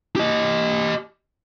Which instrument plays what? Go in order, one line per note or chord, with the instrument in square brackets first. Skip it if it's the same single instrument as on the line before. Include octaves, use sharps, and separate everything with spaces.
[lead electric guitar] G4 D#5